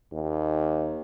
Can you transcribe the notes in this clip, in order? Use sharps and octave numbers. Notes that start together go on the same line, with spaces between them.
D#2